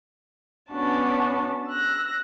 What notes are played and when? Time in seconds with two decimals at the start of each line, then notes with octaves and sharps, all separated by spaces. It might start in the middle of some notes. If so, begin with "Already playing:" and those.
0.70 B3 C#4 D4 F#4 A5
1.67 E6 F#6 A#6